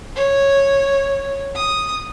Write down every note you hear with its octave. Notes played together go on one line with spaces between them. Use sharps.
C#5
D#6